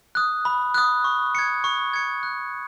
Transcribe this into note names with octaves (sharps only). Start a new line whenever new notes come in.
D#6 F#6
B5
D#6 F#6
C#6
G#6 C#7
C#6
G#6 C#7
F#6